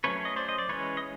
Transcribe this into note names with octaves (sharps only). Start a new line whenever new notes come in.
F#3 A3 C#4 B4 C#5
D#5
C5 D5
D#5
D5
E3 G#3 C#4 B4 C#5
D#5